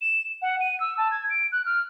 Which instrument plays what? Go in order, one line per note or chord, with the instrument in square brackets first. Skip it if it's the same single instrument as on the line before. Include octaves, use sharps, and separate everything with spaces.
[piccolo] E7
F#5
D#7
E6
A5
G#6
D7
F#6
F6